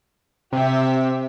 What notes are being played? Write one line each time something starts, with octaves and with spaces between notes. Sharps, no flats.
C3 G4 E5